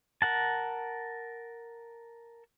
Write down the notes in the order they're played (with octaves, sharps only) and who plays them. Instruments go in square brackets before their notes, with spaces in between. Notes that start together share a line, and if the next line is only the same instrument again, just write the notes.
[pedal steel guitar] A#4 F#5 A5